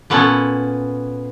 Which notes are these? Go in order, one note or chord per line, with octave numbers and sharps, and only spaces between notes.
A#2 B3 C#4 A4